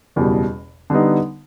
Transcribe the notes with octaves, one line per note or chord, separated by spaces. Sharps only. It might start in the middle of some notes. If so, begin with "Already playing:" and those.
F#1 E2 B2 G3
D3 G3 B3 D#4